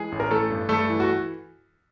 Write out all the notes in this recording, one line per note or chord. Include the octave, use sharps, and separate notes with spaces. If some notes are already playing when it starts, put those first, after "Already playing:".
Already playing: E3 G#3 G#4
A1
A#4
E3 A3 A4
G2
G3 A3 A4
E3
F#4